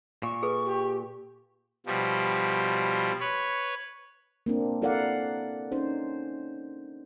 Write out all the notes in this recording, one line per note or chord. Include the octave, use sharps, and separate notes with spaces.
A#2 C#6
G#4 A4 B4
G4
B2 F3 G3
B4 C#5
A#3 C4 D4
E4 A4 A#4 D5 F5 F#5
C#4 D#4 C5